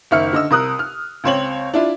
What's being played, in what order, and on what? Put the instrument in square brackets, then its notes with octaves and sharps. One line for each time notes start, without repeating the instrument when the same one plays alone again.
[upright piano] F#1 D#3 E5 F6 C#7
D3 D#5 E6
C2 A#4 D#6 F#6
F6
C#2 C4 C#5 F#7
D4 E4 F4